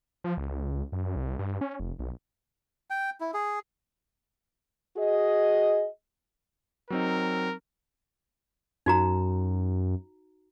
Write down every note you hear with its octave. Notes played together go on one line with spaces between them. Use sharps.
F3
C#2
F#2
C2
G2
C#4
F1
B1
G5
E4
G#4
F#4 G#4 D#5
F#3 C4 D#4 A#4
F#2 D#4 F#4 A#5